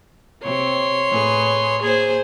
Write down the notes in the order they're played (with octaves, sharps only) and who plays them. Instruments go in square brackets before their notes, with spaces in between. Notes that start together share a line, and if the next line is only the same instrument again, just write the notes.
[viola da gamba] C3 [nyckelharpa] C#5 C6
[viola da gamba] A2 G#4 B4
[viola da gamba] A#3 C5 [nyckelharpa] G#4 G#5